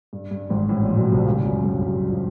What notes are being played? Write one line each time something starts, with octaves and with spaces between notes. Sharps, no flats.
G2
G2
G#1 G#2
A1 A2
A#1 A#2
B1 B2
C2 C3
C#2 C#3
G3
F#2 F#3
G2 G3
F#2 F#3
F3